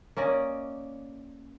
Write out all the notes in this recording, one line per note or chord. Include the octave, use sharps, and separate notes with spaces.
A#3 C#4 D5 D#5